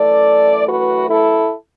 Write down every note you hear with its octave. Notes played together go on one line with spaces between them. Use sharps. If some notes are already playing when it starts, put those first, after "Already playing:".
Already playing: F#2 E3 A3 A4 D5
F#4 B4
E4 A4